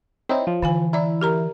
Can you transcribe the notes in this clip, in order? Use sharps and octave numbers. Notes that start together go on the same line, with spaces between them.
C4 D#4 E4 C#5
F3
D3 E3 F5 G#5
E4 D5 A#5
G4 A#4 A#5